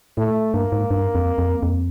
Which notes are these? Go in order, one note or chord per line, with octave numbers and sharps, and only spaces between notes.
A2 A3
G2 A#3
G#2
G2
F2
F2
F2